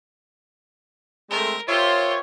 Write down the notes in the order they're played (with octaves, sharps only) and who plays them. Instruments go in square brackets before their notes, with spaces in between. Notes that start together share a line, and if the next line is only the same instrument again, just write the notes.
[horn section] G#3 A3 C4 [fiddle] A#4
[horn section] F4 A#4 E5 [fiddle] G4 C5 [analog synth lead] C#5